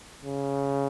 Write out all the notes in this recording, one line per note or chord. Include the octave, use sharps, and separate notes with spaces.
C#3